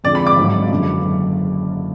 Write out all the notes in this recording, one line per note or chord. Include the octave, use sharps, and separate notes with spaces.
F2 D3 G#3 D5
B5
D6
G#1 G#2 F#3
F#1 F#2 D3 F#3